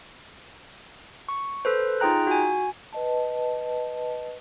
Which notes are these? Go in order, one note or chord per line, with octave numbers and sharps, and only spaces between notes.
C#6
A4 B4 C5
D#4 F4 G#4 G5 A#5 F#6
F#4 G#5
B4 D#5 A5